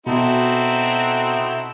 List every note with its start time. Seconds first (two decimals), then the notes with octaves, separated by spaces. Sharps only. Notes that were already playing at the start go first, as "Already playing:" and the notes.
0.07 B2 C4 D#4 E4 F#4 A4